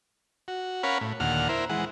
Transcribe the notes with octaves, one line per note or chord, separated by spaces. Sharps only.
F#4
C#4 A#4 C#5 F5 F#5 B5
A2
D#2 A#2 D3 F#5 F6
E4 A#4 C5
E3 G#3 F#5